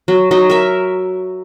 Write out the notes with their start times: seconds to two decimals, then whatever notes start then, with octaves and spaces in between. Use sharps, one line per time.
0.08 F#3
0.31 F#3 D#4
0.50 A#4 E5